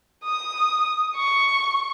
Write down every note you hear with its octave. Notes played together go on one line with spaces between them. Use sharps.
D#6
C#6